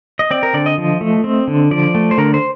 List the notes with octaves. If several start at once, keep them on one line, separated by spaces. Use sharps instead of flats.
D#5
C4 D5
A#4
D3 D5
D#5
F3
A3
C4
D3
F3 D5
A3
C5
D3 A#4
C5